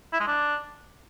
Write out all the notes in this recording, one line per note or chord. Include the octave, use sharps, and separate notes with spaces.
E4
G#3
D4